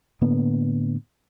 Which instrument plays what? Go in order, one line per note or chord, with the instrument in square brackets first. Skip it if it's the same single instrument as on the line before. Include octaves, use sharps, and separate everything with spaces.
[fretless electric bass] A2 D3 A#3 B3